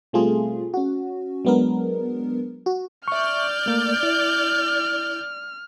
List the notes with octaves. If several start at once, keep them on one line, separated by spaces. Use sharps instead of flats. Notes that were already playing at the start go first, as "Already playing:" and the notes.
B2 G3 A3 C4 F4 G#4
C#4 F#4
F#3 G#3 B3 D4 A#4
F#4
D5 E5 C#6 F6 G6
A3 A#3
E4